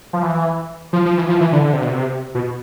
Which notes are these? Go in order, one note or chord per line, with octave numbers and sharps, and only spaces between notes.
F3
E3
F3
F3
E3
F3
E3
D3
D3
C3
B2
C3
B2